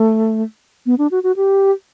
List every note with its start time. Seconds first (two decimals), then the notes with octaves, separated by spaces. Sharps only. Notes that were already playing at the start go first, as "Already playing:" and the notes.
Already playing: A3
0.86 B3
0.98 D4
1.11 F#4
1.23 F#4
1.36 G4